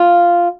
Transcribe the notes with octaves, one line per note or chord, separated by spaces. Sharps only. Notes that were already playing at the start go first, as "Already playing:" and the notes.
Already playing: F4